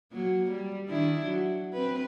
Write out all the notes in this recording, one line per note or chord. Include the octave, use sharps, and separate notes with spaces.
F#3 A#3
G3
D#3 D4 E4
F#3
C4 B4